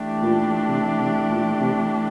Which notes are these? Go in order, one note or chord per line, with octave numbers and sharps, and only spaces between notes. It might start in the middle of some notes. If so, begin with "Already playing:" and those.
Already playing: E3 A3 D4 G4
A#2
C3
C3
A#2
C3